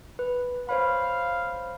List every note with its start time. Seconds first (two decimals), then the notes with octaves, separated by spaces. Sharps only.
0.19 B4
0.69 C5 C#5 F5 B5